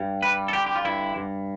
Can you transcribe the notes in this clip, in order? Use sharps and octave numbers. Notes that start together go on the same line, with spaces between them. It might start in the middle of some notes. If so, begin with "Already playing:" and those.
Already playing: G2
G3 B4
A4
D3 G4
G4
F4
G2 E4
G2